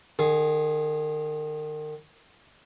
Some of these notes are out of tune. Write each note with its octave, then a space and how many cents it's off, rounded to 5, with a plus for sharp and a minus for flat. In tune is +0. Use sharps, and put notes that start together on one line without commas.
D#3 -35 G#4 +0